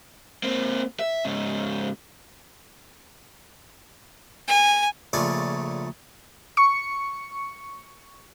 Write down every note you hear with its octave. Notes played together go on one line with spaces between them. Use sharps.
A#3 C4
E5
G#2 C#3
G#5
A#1 C#3 A3 F4 D5 G#5
C#6 C#7